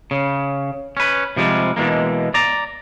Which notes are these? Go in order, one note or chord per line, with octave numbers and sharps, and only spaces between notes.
C#3
C#4 B4
C3 F3 G3 G#3
B2 E3 G#3 A#3
D5 A#5